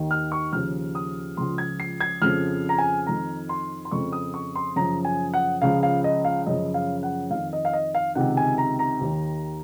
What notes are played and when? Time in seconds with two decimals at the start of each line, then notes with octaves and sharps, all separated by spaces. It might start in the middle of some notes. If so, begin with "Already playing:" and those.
Already playing: D#2 D#3
0.11 F6
0.32 C#6
0.53 D#2 C#3 F3 F6
0.95 D#6
1.37 C#2 C#3 F3 C6
1.58 G#6
1.80 C7
2.00 G#6
2.22 F2 C#3 F3 F6
2.69 A#5
2.78 G#5
3.07 F2 D#3 A#5
3.49 C6
3.85 C6
3.91 F2 C#3 F3 C#6
4.12 D#6
4.34 C#6
4.55 C6
4.76 F#2 C#3 F3 A#5
5.05 G#5
5.34 F#5
5.62 C#2 C#3 F3 F5
5.83 F5
6.04 D#5
6.25 F5
6.47 F#2 C#3 F3 D#5
6.74 F5
7.03 F#5
7.30 F2 D#3 F5
7.53 D#5
7.65 F5
7.73 D#5
7.95 F5
8.15 C#2 C3 D#3 F#5
8.37 G#5
8.58 A#5
8.79 A#5
9.01 D#2 D#3